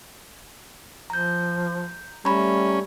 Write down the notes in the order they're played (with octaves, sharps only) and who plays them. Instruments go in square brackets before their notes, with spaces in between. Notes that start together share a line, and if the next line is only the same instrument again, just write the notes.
[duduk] F3 [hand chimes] A#5 G6
[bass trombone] G3 [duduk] A3 [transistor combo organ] C#4 [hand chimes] A#5 B5